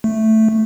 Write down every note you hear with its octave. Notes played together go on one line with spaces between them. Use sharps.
A3